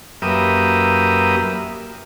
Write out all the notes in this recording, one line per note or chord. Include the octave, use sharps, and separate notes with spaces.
F#2 A#3 G4 B4 E5 D#6